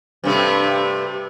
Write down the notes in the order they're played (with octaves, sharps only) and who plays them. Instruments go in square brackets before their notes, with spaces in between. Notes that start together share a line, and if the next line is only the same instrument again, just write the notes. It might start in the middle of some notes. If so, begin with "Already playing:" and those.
[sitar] G2 C3 A3